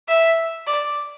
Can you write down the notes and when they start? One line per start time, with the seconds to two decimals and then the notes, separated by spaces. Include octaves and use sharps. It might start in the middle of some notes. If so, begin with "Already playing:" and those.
0.08 E5
0.67 D5